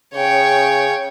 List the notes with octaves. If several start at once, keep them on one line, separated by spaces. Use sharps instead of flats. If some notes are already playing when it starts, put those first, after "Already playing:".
C#3 C#5 G5